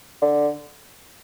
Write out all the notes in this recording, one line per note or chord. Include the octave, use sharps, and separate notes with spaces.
D3